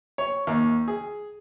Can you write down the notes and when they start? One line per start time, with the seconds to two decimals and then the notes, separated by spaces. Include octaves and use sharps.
0.18 C#5
0.47 D#2
0.88 G#4